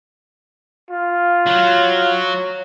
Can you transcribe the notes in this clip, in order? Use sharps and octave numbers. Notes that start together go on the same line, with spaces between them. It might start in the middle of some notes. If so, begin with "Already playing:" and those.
F4
F#3